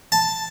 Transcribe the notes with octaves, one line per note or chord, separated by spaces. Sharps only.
A5